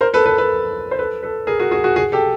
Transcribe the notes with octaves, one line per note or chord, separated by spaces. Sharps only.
A#4 C5
A4 B4
A4 B4
A4 B4
C5
A4 B4
A4 B4
G#4 A#4
F#4 G#4
F#4 G#4
F#4 G#4
F#4 G#4
G4 A4